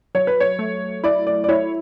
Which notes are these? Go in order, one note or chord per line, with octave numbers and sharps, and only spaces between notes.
F#3 C#5
B4
C#5
A3
E4 D5
D5
D5
E4 C#5